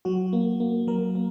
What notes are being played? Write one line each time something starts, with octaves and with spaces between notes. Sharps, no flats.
F#3 F#4
A#3
A#3
F#3 A#4
A#3